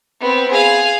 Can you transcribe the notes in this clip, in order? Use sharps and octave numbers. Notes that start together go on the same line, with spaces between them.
B3 C4
G#4 F5